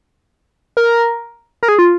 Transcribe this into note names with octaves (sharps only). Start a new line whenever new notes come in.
A#4
A#4
G#4
F4